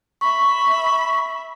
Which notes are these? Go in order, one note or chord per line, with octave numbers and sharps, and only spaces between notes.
E5 B5 C#6